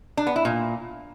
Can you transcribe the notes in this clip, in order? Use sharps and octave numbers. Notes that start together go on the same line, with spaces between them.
D4
B3
E4
A#2